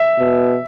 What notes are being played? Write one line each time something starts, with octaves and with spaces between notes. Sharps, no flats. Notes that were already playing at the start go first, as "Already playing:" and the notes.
Already playing: E5
B2